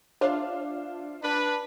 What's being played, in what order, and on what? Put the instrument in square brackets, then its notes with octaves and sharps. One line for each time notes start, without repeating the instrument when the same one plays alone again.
[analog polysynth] D4 F4 F5 [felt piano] C5 D5 E5
[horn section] D4 B4